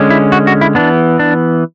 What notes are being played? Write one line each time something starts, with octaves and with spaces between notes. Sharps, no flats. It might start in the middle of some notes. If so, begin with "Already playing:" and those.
Already playing: D3 G#3 C#4
E4
F#4
F#4
E4
E3 B3 D4
D4